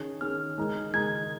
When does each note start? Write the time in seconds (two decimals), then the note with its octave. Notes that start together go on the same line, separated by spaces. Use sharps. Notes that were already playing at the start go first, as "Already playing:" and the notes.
Already playing: D#3 C#4 G#4
0.21 D#3 C#4 G#4 F6
0.57 D#3 G#3 D#4 A#4
0.93 D#3 G#3 D#4 A#4 G#6